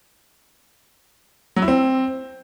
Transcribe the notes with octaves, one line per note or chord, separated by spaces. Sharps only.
F#3
E4
C4